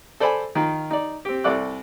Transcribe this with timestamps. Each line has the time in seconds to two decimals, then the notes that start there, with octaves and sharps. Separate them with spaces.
0.20 A4 C5 D5 G#5 B5
0.55 D#3 D#4 F4
0.91 D#4 D5
1.25 C4 G4
1.44 C2 A4 D5 E5 D6 F#6